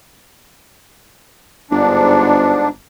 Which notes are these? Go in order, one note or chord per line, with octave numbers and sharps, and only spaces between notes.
G1 G#2 D4